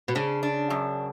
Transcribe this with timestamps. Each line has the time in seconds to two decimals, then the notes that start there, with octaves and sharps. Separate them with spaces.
0.08 B2
0.15 C#3 D4
0.43 D4
0.70 F#2